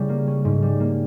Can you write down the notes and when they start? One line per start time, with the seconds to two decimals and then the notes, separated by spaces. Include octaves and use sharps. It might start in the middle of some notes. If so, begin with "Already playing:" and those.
Already playing: C#3 G3 E4
0.09 A#3
0.27 C#4
0.45 G#2
0.62 G3
0.80 A#3